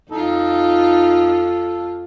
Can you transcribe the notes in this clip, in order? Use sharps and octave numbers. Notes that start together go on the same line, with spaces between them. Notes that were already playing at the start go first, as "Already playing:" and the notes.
F2 D#4 F4 A4